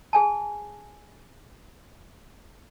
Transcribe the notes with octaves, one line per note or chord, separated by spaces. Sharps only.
G#4 G#5 A5